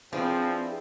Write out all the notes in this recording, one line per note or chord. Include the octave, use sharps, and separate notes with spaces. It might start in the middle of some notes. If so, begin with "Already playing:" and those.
F3 C4 D4 E4 G#4 B4